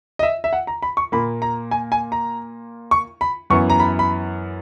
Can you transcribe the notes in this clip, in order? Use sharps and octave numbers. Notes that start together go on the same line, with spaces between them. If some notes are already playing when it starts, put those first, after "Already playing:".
D#5
E5
E5
F#5
A#5
B5
C#6
A#2 A#3 B5
A#5
G#5
G#5
A#5
C#6
B5
F#2 E3 B3 C#6
A#5
B5
B5